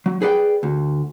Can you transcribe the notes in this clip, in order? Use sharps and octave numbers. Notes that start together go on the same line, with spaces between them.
F#3
G#4 B4 D5 F#5 G5
D2